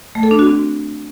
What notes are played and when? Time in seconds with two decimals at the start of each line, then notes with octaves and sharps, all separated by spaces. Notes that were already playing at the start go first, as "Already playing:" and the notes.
0.15 A3
0.23 A4
0.31 D4
0.39 F#4
0.47 C4